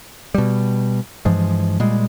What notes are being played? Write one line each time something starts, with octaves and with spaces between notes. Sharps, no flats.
B2 G3
G2 E3 F3 G#3
A#2 G3 G#3